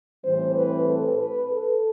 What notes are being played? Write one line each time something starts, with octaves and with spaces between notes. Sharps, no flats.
A2 E3 G3 C4 C5
B4
A4
B4
A4